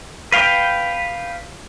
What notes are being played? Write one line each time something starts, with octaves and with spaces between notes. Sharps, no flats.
B4 F5 G5